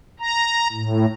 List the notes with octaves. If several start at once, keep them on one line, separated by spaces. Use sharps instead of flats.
A#5
A2